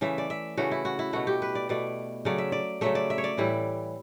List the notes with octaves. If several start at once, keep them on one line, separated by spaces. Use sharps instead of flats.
C#3 E3 A3 E5
D5
E5
C#3 E3 A3 F#4
E4
F#4
E4
B2 A3 F#4
G4
B4
D5
B2 A3 D5
C#3 F#3 A3 D5
E5
D5
C#3 F#3 A3 E5
D5
E5
C#5
D5
A2 E3 G3 E4